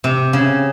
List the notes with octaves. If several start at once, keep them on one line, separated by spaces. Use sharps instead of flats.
C3
C#3